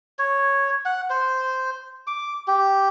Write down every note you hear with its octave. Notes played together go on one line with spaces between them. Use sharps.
C#5
F#5
C5
D6
G4